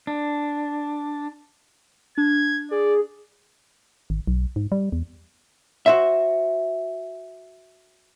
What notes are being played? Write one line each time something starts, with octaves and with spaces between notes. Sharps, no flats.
D4
D4 G#6
G#4 D5
G#1
B1
G#2
G3
E2
F#4 C5 E5